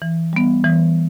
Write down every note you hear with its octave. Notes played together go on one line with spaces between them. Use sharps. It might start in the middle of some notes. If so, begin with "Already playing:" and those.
E3
G3 B3
E3